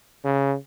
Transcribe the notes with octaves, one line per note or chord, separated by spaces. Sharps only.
C#3